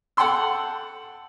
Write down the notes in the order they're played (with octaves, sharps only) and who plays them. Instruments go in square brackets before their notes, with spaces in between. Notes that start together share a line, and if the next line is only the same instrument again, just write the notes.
[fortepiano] A4 F#5 G5 A5 C6 E6